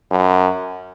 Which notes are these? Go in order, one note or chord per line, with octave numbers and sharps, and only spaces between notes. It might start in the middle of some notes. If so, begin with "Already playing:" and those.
F#2